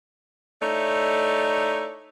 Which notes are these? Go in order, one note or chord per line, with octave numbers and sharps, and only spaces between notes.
A3 D#4 E4 C#5 D5